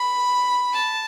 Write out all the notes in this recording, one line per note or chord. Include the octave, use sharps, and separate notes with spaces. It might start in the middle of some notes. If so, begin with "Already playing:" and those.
Already playing: B5
A5